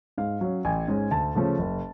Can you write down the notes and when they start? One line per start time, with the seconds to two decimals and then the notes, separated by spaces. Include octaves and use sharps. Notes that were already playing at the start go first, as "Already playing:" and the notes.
0.18 G#2 F5
0.41 F#3 C#4
0.65 A1 G#5
0.88 G#2 G#3 C#4
1.11 D2 A5
1.35 C#3 F3 A3 C#4
1.59 F#1